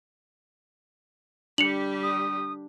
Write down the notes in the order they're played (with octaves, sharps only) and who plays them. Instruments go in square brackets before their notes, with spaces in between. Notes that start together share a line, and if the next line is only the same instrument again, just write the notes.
[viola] G3 G4 [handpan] D4 [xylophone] C#7 F7 F#7
[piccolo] D#6